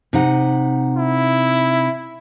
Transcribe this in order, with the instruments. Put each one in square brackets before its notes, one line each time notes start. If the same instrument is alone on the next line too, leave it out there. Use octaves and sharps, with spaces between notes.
[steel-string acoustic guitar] C3 D#4 F#5
[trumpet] E4